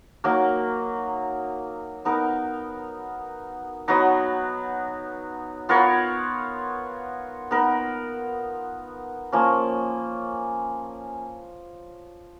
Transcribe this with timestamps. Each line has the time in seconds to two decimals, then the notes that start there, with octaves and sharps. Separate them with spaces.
0.24 F#3 A#3 D#4 A#4
2.05 B3 D#4 A#4
3.88 F#3 B3 D#4
5.69 B3 F4 A#4 C#5
7.51 B3 D#4 A#4
9.32 F3 A#3 C#4